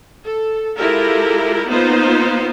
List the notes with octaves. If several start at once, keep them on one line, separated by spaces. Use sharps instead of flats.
A4
G#3 E4 F4 G4 A4 A#4
A#3 B3 D#4 F4 C5